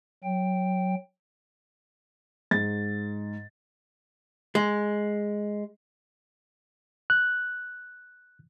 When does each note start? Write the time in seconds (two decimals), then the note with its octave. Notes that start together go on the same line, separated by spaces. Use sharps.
0.24 F#3 G5
2.51 G#2 A6
4.55 G#3
7.10 F#6